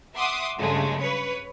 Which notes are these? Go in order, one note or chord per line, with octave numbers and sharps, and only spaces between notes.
E5 F#5 C6 D6 D#6
G2 C#3 F#3 G#3 A3
B4 C#5